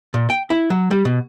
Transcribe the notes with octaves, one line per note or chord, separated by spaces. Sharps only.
A#2
G5
E4
F#3
G3
B2